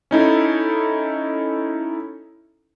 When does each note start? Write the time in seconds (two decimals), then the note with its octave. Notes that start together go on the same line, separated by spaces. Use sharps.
0.11 C#4 D#4 E4 A4